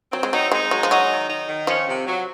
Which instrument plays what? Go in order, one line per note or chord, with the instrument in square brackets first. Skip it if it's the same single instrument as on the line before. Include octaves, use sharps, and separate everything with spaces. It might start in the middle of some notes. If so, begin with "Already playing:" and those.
[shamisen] F#3 [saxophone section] C4
[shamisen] G#3
[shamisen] F#3 [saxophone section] D#4
[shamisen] G#3 [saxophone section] D#4
[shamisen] F#3 [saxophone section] G#3
[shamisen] F3
[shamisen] F#3 [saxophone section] D#4
[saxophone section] D#3
D#4
D#3
[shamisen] F3 [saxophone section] C#4
[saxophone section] C3
F#3